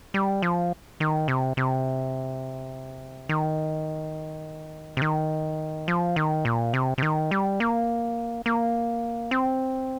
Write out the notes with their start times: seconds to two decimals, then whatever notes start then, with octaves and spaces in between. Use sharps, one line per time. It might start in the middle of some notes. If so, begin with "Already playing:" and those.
0.14 G3
0.42 F3
1.00 D#3
1.28 C3
1.57 C3
3.29 D#3
4.97 C3
5.02 D#3
5.88 F3
6.16 D#3
6.45 A#2
6.74 C3
6.98 C3
7.03 D#3
7.31 G3
7.60 A#3
8.46 A#3
9.31 C4